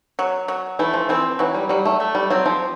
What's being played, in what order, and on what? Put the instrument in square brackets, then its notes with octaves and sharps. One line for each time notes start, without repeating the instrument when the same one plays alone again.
[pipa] F#3
F#3
[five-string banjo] E3 [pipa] A3
[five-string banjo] F3
[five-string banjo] E3 [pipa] C4
[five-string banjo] E3 [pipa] F#3
[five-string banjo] G3
[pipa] F#3 [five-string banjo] G3
[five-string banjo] A3
[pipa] A3
[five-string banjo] G3
[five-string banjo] F#3 [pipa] C4
[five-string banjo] F3